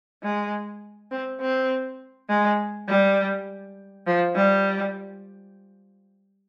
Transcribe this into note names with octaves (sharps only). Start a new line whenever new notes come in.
G#3
C4
C4
G#3
G3
F3
G3